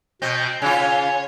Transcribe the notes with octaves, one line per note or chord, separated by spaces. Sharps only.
B2 C4 D#5 G6
C#3 F4 C#5 G#5